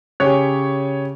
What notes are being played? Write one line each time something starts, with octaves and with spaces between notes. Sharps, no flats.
C#3 G4 C#5 G#5